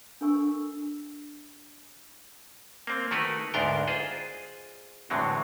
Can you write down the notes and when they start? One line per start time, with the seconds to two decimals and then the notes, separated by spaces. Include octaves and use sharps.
0.21 D4 A4 A#4 G#5 C#6 E6
2.87 A#3 C4
3.11 D#3 A3 F#4 A#4 B4
3.54 D2 G#2 B3 D4 A#4 G5
3.88 F4 G#4 C5 D#5
5.10 E2 A2 D3 F#3 G#3 C4